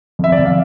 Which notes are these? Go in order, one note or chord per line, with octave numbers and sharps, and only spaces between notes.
F2 E5
D5
F2
F5